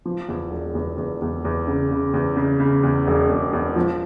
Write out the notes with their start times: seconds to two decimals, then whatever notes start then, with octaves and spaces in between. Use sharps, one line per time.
0.05 F3
0.28 E2
0.51 E1
0.75 E2
0.97 E2
1.22 E2
1.45 E2
1.67 C#3
1.91 C#3
2.14 E2
2.36 C#3
2.60 C#3
2.83 E2
3.07 E1
3.30 E1
3.53 E2
3.76 F3